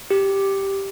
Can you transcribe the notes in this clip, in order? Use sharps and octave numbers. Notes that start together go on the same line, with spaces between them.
G4